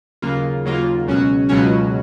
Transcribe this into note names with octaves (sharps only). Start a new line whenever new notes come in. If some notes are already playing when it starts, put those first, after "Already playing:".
D#2 C#3 F#3 A#3 F4
D#2 C#3 F#3 A#3 F4
C#2 B2 F#3 C#4 F#4
C#2 B2 F#3 C#4 F#4